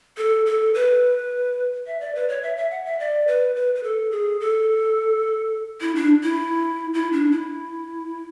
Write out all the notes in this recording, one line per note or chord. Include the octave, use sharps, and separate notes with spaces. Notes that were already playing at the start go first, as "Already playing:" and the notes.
A4
A4
B4
E5
D5
B4
C#5
E5
E5
F#5
E5
D5
B4
B4
B4
A4
G#4
A4
E4
D4
E4
E4
D4
E4